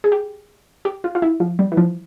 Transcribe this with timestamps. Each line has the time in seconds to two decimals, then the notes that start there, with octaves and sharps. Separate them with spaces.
0.04 G#4
0.12 G4
0.85 G4
1.04 F4
1.15 F4
1.22 E4
1.40 F3
1.59 G3
1.72 E3
1.77 F3